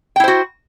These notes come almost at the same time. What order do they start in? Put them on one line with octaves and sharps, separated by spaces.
G5 E4 C5 F#4